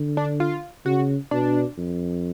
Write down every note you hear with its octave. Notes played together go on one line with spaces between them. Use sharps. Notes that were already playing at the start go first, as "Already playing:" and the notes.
Already playing: D3
D4
F4
C#3 F#4
B2 D4
F2